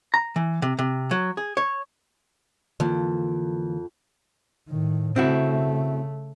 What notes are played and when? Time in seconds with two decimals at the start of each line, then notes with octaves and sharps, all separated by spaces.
0.14 A#5
0.36 E3
0.62 C3
0.79 C3
1.11 F#3
1.37 G#4
1.57 C#5
2.80 F2 D3 E3 A#3
4.69 A2 D#3
5.16 C#3 A3 C4 E4 F#4